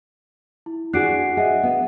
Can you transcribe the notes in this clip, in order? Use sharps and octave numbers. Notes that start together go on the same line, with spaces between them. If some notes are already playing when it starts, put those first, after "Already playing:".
E4
D4 F#4 G#4 F#6 C7 D7
G#4 D#5 E5 F#5
B3